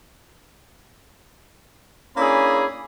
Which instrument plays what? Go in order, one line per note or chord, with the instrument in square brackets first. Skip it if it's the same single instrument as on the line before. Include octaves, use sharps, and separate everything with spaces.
[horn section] A#3 C#4 D4 E4 G#4 B5